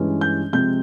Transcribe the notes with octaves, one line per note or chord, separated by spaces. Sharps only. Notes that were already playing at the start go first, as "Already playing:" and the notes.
Already playing: G2 E3 G#3 C#4
G6
C3 F3 G#3 C4 G6